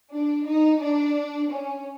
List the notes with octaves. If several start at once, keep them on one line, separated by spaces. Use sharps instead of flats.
D4
D#4
D4
C#4